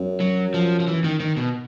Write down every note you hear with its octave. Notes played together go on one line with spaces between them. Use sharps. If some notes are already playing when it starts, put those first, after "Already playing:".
Already playing: F#2
F#3
F3
F3
E3
D#3
D#3
B2